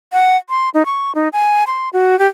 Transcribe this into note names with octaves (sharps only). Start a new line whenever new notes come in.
F#5
C6
D#4
C#6
D#4
G#5
C6
F#4
G4